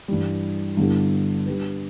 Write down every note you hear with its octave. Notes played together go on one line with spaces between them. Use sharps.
G2 E3 G3
G2 D3 B3 E4 G4
G3 D4 B4